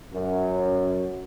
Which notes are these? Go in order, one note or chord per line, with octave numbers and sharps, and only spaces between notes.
F#2